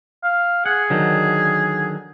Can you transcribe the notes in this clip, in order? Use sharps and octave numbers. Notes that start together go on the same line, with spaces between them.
F5
G#4 F#5
D3 D#3 F#3